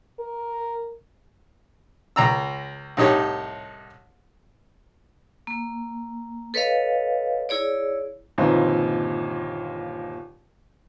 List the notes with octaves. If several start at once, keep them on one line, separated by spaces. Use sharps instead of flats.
A#4
C#2 A#5 E6
C2 A2 D#4 G4 C#5
A#3
A4 B4 C#5 D#5 F5
E4 G#4 C#5 D5
G1 D#2 A#2 E3 C4 D#4